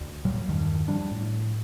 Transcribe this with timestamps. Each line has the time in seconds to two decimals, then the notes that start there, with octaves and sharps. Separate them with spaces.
0.01 D2
0.25 A#2 F#3 G3
0.49 E2 G2 D#3
0.88 F3 G3 D4
1.12 A2